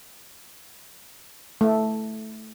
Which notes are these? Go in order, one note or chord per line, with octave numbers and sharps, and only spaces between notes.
A3